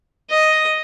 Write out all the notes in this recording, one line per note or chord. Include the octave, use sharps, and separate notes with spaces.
D#5